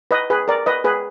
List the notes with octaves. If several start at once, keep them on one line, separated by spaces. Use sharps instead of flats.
B4 D#5
G#4 B4
A#4 D5
B4 D#5
G#4 B4